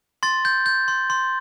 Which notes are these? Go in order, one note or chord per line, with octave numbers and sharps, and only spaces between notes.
C6 A6
G6
G6
C6
C6